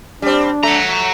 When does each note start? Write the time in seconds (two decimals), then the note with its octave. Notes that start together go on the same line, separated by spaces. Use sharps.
0.22 G3 C4 D4
0.63 A3 F#5 A#5